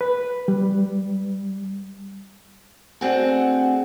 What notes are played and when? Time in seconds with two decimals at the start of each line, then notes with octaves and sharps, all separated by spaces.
0.01 B4
0.48 G3
3.01 A3 C4 D4 F#4 G#4